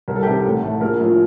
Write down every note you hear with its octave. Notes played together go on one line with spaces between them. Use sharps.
C2 A#4
A4
G4
C3 D#3 A4
A1
A2 A3
A#1 A#4
A2 F3